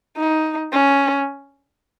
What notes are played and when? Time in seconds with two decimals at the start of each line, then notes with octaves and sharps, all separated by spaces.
0.17 D#4
0.73 C#4